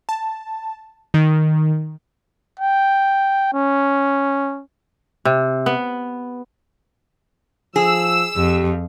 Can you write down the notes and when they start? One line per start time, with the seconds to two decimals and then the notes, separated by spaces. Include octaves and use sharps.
0.09 A5
1.14 D#3
2.59 G5
3.53 C#4
5.25 C3
5.66 B3
7.76 F3 G#4 E6
8.37 F2 G4